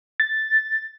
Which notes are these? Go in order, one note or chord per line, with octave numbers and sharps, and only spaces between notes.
A6